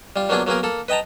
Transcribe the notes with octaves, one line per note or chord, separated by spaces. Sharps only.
G3 F4
F#3 A#3 B3 D4 F4 G#4
F#3 A#3 B3 G#4 A#4
A#3 A4
B4 D#5 G5 A5 A#5